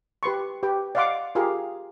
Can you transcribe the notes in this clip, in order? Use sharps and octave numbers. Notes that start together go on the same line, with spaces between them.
G4 B4 C6 C#6
G4 B4 G5
D5 D#5 F5 F#5 C6 D6
F4 G4 G#4 A#4 F5 C6